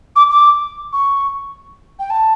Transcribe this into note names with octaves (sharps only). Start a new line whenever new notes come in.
D6
D6
C#6
G5
A5